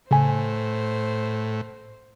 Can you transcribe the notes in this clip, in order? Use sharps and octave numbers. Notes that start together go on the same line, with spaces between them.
A2 C#3 C5 G#5 B6